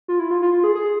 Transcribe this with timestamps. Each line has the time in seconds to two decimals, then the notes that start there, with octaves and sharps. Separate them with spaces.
0.08 F4
0.19 E4
0.31 F4
0.42 F4
0.53 F4
0.64 G#4
0.75 G#4